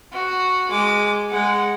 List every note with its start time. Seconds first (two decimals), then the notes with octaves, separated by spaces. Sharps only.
0.13 F#4
0.71 G#3 D6
1.30 G#3 F#5